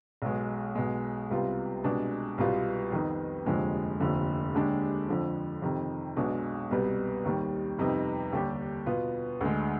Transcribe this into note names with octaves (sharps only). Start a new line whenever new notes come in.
B1 B2 G#3
B1 B2 G#3
C2 C3 G3 B3 F4
C2 B2 G#3 D4
C2 B2 G3 B3 F4
F2 D#3 B3 D#4
F1 D#2 D3 F3 G#3
F1 D#2 D3 F3
D#2 D3 G#3 D4 G4
F2 D3 F3
F2 C3 D#3
B1 B2 G#3 D4
C2 B2 G3 B3
D#2 D#3 G3
F2 C3 G3 B3 D#4
D#2 D3 G3 D4 G4
B2 B3 F4
D2 D3 G#3